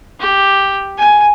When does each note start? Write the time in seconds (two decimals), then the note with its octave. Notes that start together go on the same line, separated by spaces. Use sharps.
0.20 G4
0.98 G#5